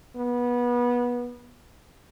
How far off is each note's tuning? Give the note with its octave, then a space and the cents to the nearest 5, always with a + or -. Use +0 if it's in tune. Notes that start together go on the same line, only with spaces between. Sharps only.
B3 -20